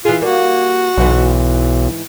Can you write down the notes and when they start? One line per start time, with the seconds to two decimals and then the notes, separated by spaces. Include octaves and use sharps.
0.05 E3 F4 G#4
0.22 G3 A#3 F#4
0.97 B1 G#2 E3